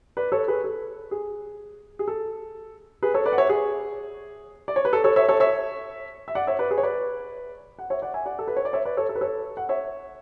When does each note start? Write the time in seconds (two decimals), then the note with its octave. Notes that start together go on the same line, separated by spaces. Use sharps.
0.17 B4 D5
0.32 A4 C#5
0.48 G#4 B4
0.64 A4
1.11 G#4
1.99 G#4
2.08 A4
3.03 G#4 B4
3.14 A4 C#5
3.26 B4 D5
3.33 F#5
3.38 C#5 E5
3.49 G#4
4.68 D5
4.76 C#5
4.85 B4
4.93 A4
5.04 A4 C#5
5.16 C#5 E5
5.28 A4 C#5
5.40 C#5 E5
6.28 E5
6.35 D5 F#5
6.47 C#5 E5
6.59 B4 D5
6.71 G#4 B4
6.78 C#5
6.83 B4 D5
7.79 F#5
7.90 C#5 E5
8.02 D5 F#5
8.14 E5 G#5
8.26 D5 F#5
8.39 A4
8.47 B4
8.57 C#5
8.65 D5
8.73 C#5 E5
8.85 B4 D5
8.97 A4 C#5
9.09 A4
9.15 B4
9.21 A4 C#5
9.57 F#5
9.69 C#5 E5